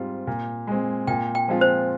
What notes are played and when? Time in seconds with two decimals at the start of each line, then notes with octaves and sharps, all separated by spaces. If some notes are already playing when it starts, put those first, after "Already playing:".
Already playing: G#2 G3 C4 F4
0.27 A#2
0.67 G#3 C4
1.07 A#2 G5
1.35 G5
1.48 F3 G#3 C4 F4
1.61 C5